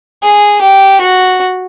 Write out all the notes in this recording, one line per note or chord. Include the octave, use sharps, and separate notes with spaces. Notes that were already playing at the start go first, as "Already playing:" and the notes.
G#4
G4
F#4